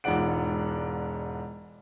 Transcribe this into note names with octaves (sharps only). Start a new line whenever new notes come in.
E1 G#2 F4 D5 F#5 D7